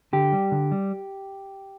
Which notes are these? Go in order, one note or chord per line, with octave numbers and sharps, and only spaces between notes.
D3 G4
G3
D3
G3